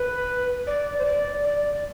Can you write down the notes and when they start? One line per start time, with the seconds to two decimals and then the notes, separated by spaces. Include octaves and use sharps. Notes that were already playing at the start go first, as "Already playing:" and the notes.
Already playing: B4
0.67 D5
0.98 C5
1.05 D5
1.44 D5